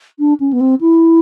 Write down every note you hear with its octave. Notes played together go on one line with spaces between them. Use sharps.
D4
C#4
B3
C4
E4